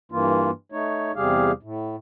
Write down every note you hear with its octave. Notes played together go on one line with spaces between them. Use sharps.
G2 E3 A#3 F4
A3 D#4 C#5
E2 C3 G3 G4 G#4 F5
A2